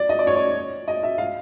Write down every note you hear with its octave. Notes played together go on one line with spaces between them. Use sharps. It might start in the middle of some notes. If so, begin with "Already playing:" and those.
Already playing: D5
D#5
D5
C#5
D5
D#5
E5
F5